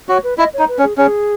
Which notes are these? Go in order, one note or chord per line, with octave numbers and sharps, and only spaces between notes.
F#4 C#5
B4
E4 D#5
C#5
D#4
B4
C#4
G#4
C#4 G#4